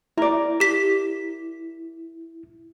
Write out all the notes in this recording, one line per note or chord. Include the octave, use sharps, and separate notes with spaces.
E4 A#4 D5
G4 B6